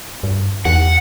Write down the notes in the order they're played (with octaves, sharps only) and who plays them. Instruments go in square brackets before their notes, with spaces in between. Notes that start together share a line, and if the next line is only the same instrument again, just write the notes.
[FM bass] G2
[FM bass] E2 [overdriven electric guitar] F#5